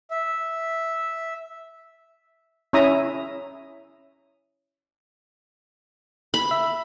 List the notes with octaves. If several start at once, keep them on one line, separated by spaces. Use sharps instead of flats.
E5
C#4 E4 E5 A#5 D#6
B5
E5